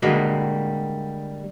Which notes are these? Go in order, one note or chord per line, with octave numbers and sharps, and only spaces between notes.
D3 G3 G#3 A#3 F#4